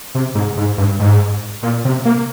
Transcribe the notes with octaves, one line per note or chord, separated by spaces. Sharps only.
C3
G#2
G#2
G2
G#2
A#2
C3
A#3